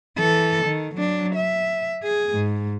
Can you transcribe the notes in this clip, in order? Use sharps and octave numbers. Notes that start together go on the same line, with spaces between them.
E3 A4
D#3
F#3 D4
E5
G#4
G#2